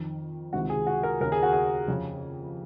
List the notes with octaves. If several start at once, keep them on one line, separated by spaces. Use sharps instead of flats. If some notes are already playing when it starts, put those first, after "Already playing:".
Already playing: F2 D#3
C#2 C3 D#3 F#4
G#4
F#4
A#4
D#2 C#3 A#4
G#4
F#4
G#4
F2 C#3